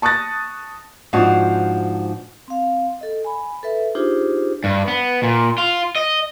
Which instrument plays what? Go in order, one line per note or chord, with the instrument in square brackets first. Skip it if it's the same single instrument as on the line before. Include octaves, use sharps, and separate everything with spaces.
[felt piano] A5 C#6 D#6 F#6 A6 A#6
[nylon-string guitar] G#2 F3 D4 F4 F#4
[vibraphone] C4 F5
A4 D#5
G#5 B5
A4 B4 E5
D4 D#4 F4 G4 G#4 C5
[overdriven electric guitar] G2
B3
A#2
F4
D#5